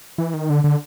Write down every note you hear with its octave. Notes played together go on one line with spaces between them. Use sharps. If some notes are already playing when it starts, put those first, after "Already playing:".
E3
D#3
D3
D3